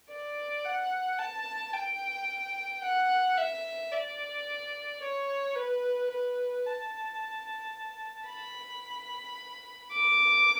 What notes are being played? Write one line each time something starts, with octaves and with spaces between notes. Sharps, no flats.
D5
F#5
A5
G5
F#5
E5
D5
C#5
B4
B4
A5
B5
D6